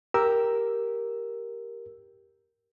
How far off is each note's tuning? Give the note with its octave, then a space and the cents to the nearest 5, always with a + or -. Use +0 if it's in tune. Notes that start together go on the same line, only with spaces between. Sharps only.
G4 +0 A#4 +0 E6 +0